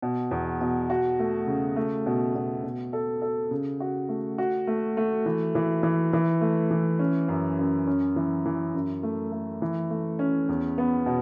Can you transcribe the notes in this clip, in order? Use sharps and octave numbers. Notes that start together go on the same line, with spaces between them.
B2
E2
B2
F#4
A3
C#3
A3
B2
B2
B2
A4
A4
C#3
F#4
A3
F#4
A3
A3
E3
E3
E3
E3
A3
E3
C#4
F#2
F#2
C#4
E3
E3
F#2
A3
A3
E3
A3
C#4
E2
B3
B2